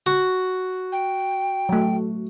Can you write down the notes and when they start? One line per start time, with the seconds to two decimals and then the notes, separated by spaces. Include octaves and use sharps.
0.06 F#4
0.92 G5
1.69 F#3 A3